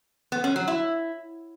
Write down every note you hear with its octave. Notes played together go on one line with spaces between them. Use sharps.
B3
C#4
F#3
E4